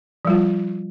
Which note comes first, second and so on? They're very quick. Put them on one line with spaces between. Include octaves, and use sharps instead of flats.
F3 G3 F4